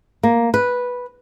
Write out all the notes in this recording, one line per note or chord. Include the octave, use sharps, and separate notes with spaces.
A#3
B4